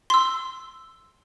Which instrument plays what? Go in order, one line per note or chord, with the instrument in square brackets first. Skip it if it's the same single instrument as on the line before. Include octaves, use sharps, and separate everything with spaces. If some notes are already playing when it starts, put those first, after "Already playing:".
[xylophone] C6 E6